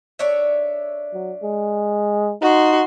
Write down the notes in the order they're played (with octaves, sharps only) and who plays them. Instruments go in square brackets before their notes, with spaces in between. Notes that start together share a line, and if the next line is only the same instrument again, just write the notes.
[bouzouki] D4 C#5 E5
[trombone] F#3
G#3
[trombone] D#4 [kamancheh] F#4 C6